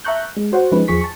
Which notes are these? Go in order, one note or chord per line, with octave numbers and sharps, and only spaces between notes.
E5 A5 A#5 C#6 F#6 G6
G#3
F#4 C5 C#5 F#5
F3 G#3 C#4 D#4 B4
E2 F3 G#4 C#6 B6
A5 C#6